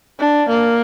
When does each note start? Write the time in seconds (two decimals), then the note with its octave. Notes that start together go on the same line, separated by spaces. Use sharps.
0.19 D4
0.49 A#3